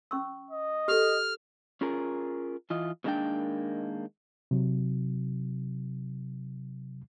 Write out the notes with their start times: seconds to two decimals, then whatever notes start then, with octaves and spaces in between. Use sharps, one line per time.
0.11 C#4 C#6 E6
0.51 D#5
0.88 G4 A4 F6
1.81 C#4 F4 G#4 A#4
2.70 E3 F4 D#5
3.04 B2 D#3 G#3 A#3 D4 G5
4.51 C3 F#3